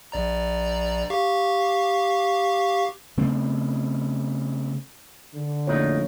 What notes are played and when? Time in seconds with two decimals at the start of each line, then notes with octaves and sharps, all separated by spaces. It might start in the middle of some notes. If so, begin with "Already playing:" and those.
0.12 A#1 D5 A#5
1.10 G4 F5 C#6
3.17 C#3 A3 B3 C4
5.35 D3
5.67 A#1 F2 A2 D#4 C#5